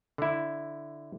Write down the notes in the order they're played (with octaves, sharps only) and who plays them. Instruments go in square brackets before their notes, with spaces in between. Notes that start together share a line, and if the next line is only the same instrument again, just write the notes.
[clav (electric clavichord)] D3 E4